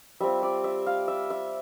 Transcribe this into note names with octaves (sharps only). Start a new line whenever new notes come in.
G3 C4 F4 E5
D5
E5
F5
E5
E5